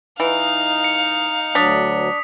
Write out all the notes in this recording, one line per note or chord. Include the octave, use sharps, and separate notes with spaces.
E3 D#4 F5
C#7
D2 F#3 D4 D#6 B6